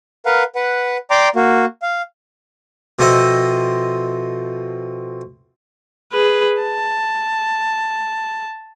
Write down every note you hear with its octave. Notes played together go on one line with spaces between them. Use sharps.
A#4 B4 F5 F#5
B4 F#5
D5 G5 A#5 C6 D6
A#3 F#4
F5
B2 F3 C4 A4 D#5 E5
G#4 B4
A5